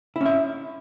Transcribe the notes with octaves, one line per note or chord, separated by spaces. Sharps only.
C#4 E4 E5